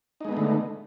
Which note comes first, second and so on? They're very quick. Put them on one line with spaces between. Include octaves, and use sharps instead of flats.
D#4 G#3 B3 A3 D3